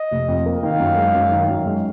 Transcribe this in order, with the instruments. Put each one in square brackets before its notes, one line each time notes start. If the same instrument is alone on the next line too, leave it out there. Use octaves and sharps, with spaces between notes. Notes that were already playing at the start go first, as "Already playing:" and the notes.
Already playing: [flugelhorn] D#5
[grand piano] F1
F2
A#3
[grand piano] D#3 [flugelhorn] F5
[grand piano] F#2
G#3
F#2
D#3
F#2
G#3